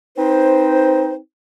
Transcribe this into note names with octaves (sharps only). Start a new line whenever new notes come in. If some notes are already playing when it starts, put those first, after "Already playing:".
C4 D#4 B4 C5